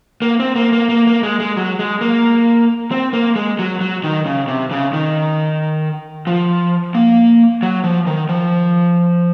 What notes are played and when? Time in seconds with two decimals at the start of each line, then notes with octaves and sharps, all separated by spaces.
0.22 A#3
0.40 C4
0.56 A#3
0.73 A#3
0.89 A#3
1.07 A#3
1.23 G#3
1.40 G#3
1.57 F#3
1.79 G#3
2.01 A#3
2.91 C4
3.13 A#3
3.36 G#3
3.59 F#3
3.81 F#3
4.04 D#3
4.26 C#3
4.48 C3
4.71 C#3
4.93 D#3
6.27 F3
6.95 A#3
7.63 F#3
7.84 F3
8.07 D#3
8.29 F3